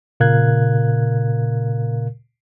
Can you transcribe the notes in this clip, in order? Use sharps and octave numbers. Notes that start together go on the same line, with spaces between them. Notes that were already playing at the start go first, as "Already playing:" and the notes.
A#2 C#3 A#4 F5 F#6 G#6